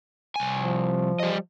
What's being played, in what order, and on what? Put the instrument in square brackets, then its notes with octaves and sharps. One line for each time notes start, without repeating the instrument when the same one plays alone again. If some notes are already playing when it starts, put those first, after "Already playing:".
[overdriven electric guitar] C2 G#5
[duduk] F3
[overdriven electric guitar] G3 D#5